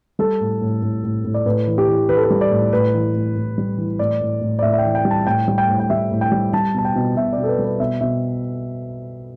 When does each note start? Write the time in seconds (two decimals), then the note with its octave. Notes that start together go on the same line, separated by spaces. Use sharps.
0.19 G3 A4
0.40 A2
0.61 A2
0.82 A2
1.04 A2
1.25 A2
1.34 D5
1.46 A2 B4
1.67 E3
1.78 G4
1.88 E3
2.09 E3 B4
2.17 A4
2.23 B4
2.30 G3
2.41 D5
2.51 A2
2.73 A2 B4
2.94 E3
3.15 A2
3.36 A2
3.58 G3
3.78 E3
3.99 A2 D5
4.21 A2
4.41 A2
4.59 D5
4.62 A2 E5
4.73 E5
4.78 G5
4.84 E3
4.95 G5
5.05 G3
5.11 A5
5.26 A2 G5
5.48 G3
5.58 G5
5.69 A2
5.80 G5
5.90 G3 E5
6.11 A2
6.21 G5
6.32 G3
6.53 G3 A5
6.74 B2 A5
6.85 G5
6.95 B2
7.16 B2 E5
7.33 D5
7.38 B2
7.43 A4
7.48 B4
7.58 G3
7.64 B4
7.80 B2 E5
8.01 B2 E5